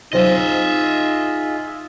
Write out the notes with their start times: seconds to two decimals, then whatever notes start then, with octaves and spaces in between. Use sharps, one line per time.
0.13 C2 F#2 C4 D#4 F4 G#4 D#5 E5